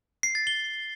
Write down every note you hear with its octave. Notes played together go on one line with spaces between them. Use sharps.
C7
A6
G7